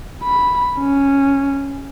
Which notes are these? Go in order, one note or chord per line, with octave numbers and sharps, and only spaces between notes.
B5
C#4